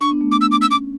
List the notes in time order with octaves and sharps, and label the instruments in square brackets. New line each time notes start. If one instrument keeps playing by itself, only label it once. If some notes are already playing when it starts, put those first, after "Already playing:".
[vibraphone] D4 [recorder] C#6
[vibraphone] B3
A3
[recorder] D6
E6
D6
[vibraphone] C#4 [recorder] E6
[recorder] D6